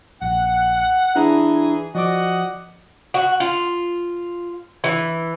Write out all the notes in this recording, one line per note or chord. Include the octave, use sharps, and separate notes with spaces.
A#1 F#5
E3 D4 E4 G#4 A#5
F3 F#4 D5 D#5 F#5 D6
F#4
F4
E3